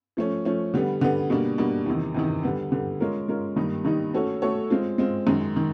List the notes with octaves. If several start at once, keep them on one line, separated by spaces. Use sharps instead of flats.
F3 A3 C#4
F3 A3 C#4
D3 G3 B3
D3 G3 B3
B2 G3 A#3 D4
B2 G3 A#3 D4
E2 C3 D#3
E2 C3 D#3
D3 G3 B3
D3 G3 B3
G#3 C#4 F4 A#4
G#3 C#4 F4 A#4
G2 D#3 G3 A#3 D#4
G2 D#3 G3 A#3 D#4
A3 C#4 F#4 A4 C#5
A3 C#4 F#4 A4 C#5
G#3 C4 F4
G#3 C4 F4
F#2 D#3 G#3
D#3